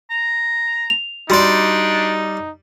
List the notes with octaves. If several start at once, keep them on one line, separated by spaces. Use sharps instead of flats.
A#5
F7
G3 D4 D#4 F#4 D5 C6